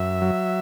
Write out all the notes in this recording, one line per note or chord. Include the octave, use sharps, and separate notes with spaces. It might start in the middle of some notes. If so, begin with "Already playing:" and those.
Already playing: F#2 E5
F#3